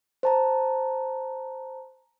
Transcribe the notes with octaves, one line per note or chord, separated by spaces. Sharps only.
C5 A5 A#5